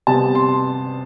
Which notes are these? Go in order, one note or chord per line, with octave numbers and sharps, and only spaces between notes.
C3 G3 B3 A5
C6